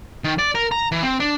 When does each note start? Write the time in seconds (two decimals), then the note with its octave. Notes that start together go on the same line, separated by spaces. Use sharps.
0.24 D#3
0.39 D5
0.55 A#4
0.72 A#5
0.92 E3
1.03 C4
1.20 D4